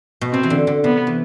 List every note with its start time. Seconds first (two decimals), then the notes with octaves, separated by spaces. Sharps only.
0.21 B2
0.33 C3 C4
0.43 E3
0.50 D3
0.67 D3
0.84 C3 B3
1.07 E3